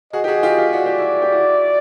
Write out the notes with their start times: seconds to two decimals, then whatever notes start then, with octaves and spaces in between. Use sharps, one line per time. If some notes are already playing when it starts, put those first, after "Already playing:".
0.13 F#4 G#4 D#5
0.24 G4
0.28 F#4 G#4
0.43 F4 G4
0.58 F4 G4
0.73 F#4 D5
0.86 G4
0.98 E4 F#4
1.22 G4
1.32 E4 F#4